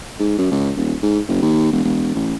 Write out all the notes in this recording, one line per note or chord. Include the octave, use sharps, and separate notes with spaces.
G#2
F#2
C#2
D#1
G#2
F#1
D#2
E1
E1
A1